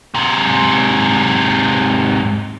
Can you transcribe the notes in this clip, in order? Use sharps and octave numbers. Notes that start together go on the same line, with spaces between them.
G#2 C3